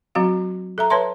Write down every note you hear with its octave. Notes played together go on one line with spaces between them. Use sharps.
F#3 C4 F#4 F5
A4 E5 A#5
B4 C#5 E5 A5 C6